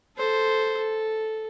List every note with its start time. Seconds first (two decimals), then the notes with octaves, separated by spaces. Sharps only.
0.17 A4 C5
0.77 A4